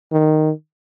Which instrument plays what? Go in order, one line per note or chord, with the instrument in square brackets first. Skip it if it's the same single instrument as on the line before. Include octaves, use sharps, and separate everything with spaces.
[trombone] D#3